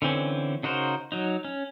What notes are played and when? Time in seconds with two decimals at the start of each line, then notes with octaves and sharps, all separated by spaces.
0.02 D3 E3 C4 C#4
0.63 C#3 D#4 F#4 A#4 C5
1.12 F#3 D#4
1.45 C#4